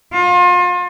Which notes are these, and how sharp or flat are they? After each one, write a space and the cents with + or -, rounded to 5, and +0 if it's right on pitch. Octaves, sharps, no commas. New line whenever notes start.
F4 +35